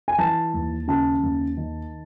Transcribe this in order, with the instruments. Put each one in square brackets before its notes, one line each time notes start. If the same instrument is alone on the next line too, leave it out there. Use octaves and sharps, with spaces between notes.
[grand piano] G#5
E3 A5
D#2
C#3 A5
D#2
D#3